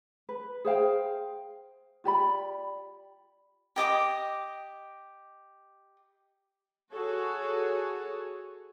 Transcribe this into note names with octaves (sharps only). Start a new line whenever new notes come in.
B4
G#4 C5 F5 G5
F4 G4 D5 B5
G4 D#5 D6 D#6
F#4 G#4 A4 C#5